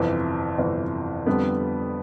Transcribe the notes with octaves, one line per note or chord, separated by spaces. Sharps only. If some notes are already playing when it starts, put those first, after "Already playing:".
Already playing: G1 F2 C3 E3
G1 F2 C3 E3
F2 D3 G3 B3